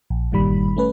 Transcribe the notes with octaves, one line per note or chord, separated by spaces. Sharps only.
A#1
G1 A#2 D#3 G3 B5
A3 C#4 B4